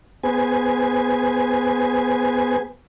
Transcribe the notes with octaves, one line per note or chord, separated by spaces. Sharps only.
B3 G#4 B4 C5 G#5